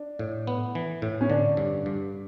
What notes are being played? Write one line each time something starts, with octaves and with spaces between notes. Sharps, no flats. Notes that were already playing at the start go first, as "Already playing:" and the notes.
Already playing: D4
A2
B3
E3
A2
C#4
D3 D4
G2
G2